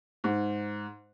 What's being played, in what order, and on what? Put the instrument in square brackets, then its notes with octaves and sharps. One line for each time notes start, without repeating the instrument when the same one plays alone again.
[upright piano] G#2